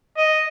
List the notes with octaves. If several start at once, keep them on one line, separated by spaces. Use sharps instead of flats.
D#5